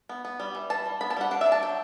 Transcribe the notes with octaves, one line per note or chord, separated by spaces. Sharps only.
B3
B3
G3
E3
E3 A5
G3
B3 B5
A5
G3 F#5
D4 F#5
E5
D4
A5
F#3 G5